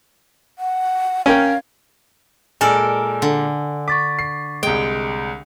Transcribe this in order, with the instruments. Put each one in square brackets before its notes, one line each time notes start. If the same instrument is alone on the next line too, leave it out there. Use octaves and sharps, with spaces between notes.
[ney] F#5
[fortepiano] C#4 A#4 G5 [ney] F5
[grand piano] A#2 G#3 [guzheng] A4 A#4 D5 [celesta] G#5 E6
[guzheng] D3
[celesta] C#6 A6 B6 [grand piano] D6
[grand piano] C7
[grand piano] C2 G#3 [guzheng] G5 [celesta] D7